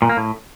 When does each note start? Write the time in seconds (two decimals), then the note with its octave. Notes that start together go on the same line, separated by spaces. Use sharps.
0.02 A#2
0.09 A#3
0.17 A2